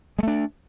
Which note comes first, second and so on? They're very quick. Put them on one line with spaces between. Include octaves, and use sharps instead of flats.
G#3 A3 D4